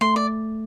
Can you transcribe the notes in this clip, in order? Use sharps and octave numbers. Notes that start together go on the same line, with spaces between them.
A3 C6
D5